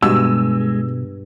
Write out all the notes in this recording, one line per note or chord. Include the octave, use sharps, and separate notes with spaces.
G2 B2 G#3 E6